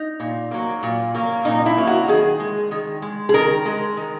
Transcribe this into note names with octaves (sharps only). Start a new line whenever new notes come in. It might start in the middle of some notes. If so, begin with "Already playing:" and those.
Already playing: D#4
A#2
F#3 A#3
A#2
F#3 A#3
A#2 D#4
E4
F#3 A#3
F#4
D#3 G#4
G#3
D#3
G#3
G#4
D#3 A#4
G#3
D#3